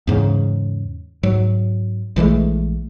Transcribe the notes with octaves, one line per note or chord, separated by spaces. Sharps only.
E2 G#2 C#3
G#2 F#3
A#1 E3 G#3 A3